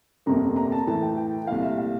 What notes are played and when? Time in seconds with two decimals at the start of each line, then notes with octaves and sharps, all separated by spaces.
0.26 G1 F2 C3 G3 A#3 A#5
0.56 A#5
0.72 A5
0.87 A2 E3 A3 E4 A5
1.02 G5
1.17 G5
1.47 C2 A#2 A3 E4 F5
1.63 E5
1.78 F5